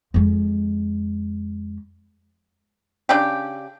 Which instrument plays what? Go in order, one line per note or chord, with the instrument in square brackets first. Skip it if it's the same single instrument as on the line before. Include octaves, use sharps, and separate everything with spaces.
[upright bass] F2 G#3
[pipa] C#3 D4 G4